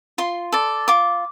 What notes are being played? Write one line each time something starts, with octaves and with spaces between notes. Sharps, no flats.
F4 C6
A4 D5
F4 D6